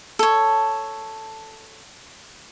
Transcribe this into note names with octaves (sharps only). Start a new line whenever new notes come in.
A4 C#5